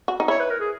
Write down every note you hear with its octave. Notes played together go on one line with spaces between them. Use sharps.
F#4
D#4
E4 C#5
B4
A#4
G#4